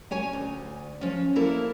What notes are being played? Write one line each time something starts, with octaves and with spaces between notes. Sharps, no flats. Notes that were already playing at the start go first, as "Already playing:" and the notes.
C#4 C#5 G#5
D2
F3 C#4
A#3 E4 A4 A#4